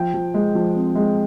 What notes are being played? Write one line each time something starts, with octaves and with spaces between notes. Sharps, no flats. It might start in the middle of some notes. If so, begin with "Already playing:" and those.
Already playing: F3 G5
F3
G#3
F3
C4
G#3